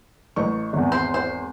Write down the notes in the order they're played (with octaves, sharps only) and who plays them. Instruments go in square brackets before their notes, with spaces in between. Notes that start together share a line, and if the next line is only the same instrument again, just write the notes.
[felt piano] A1 C#6
G#1 E2
[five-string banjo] C5
C5